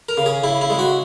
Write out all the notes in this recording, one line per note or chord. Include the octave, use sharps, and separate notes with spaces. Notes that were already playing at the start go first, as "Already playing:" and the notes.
A#4
C#3
G#4
C#3 E4
E4
G#3
F#4